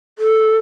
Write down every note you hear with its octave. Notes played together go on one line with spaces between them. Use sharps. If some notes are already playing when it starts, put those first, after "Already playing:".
A4